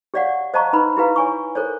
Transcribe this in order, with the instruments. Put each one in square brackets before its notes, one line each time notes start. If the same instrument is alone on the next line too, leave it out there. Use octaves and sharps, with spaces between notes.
[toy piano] G4 C#5 D5 F5 F#5
C5 D#5 F5 A5 A#5 C#6
D#4 B4 B5 C6
E4 G4 B4 F5 A#5
C#5 G#5 C#6
A4 A#4 C5 C#5